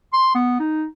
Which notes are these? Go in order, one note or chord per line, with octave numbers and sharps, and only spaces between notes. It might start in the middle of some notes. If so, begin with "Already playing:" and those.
C6
B3
D#4